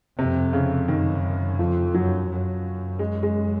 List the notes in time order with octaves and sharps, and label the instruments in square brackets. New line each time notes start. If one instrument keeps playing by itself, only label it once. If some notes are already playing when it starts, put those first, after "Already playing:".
[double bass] F2 [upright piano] C3
[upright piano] C#3
[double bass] F#2 [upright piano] D#3
[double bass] F2 [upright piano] F3
[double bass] F#2 [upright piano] F#3
[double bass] F#2
[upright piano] G#3
G#3